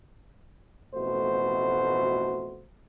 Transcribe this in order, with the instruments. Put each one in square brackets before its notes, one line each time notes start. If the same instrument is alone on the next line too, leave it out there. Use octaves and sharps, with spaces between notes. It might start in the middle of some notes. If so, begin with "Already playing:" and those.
[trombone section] A1 F2 B2 A3 F#4 C5